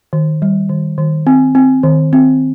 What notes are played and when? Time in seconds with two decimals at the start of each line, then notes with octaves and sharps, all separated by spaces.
0.13 D#3
0.42 G3
0.69 D#3
0.98 D#3
1.27 C4
1.55 C4
1.83 D#3
2.13 C4